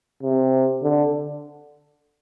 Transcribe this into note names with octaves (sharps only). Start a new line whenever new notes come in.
C3
D3